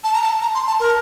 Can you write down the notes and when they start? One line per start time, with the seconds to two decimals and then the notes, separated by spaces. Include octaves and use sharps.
0.04 A5
0.13 A#5
0.22 A5
0.42 A#5
0.55 C6
0.67 A5
0.80 A#4